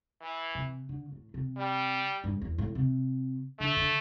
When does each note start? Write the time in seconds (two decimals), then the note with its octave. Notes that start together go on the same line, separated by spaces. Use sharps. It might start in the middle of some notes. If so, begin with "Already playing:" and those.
0.22 E3
0.55 C3
0.89 D3
1.12 A2
1.34 C3
1.57 G3
2.24 G2
2.41 E2
2.58 A2
2.75 C3
3.60 D3 A3
3.77 D3